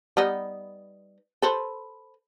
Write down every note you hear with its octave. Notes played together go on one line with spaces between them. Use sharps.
G3 B3 D#4
A4 B4 C5